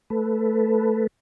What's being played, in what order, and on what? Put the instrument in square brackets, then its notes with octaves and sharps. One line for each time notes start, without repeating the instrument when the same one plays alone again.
[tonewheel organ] A3 A4 B4